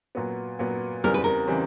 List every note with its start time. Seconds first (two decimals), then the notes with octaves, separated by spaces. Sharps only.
0.15 A#2 F#3 B3
0.59 A#2 F#3 B3
1.04 E2 C#3 E3 G3 C4 A#4
1.14 B4
1.24 A#4
1.47 C#3 E3 G3 C4